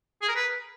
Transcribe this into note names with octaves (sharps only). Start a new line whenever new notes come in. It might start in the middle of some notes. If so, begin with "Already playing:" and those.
G#4
A#4
B4